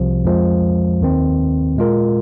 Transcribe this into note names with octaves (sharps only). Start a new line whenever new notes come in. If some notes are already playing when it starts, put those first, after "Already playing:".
Already playing: C2 C3 F3
F2 F3 G#3
D#2 D#3 C4
A#2 G#3 F4 A#4